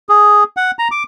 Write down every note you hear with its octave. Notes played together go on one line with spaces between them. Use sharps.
G#4
F#5
A#5
D6